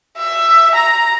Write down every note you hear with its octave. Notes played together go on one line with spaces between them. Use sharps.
E5
A#5